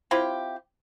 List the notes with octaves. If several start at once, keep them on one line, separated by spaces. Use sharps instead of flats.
C4 E4 F4 G4